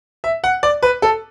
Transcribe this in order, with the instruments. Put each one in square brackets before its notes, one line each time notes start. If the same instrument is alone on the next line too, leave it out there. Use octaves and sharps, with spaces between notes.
[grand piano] E5
F#5
D5
B4
A4